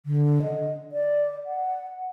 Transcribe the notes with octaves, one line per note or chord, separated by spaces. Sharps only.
D3
D#5
D5
F#5